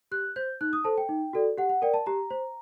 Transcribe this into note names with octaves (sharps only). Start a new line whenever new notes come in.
G4 F#6
C5 G6
D#4 F#6
D#6
A4 C5 A5
G5
D#4
F#4 A4 D5
G4 F#5
F#5
A#4 D5 G5
A5
G4 A#5
C5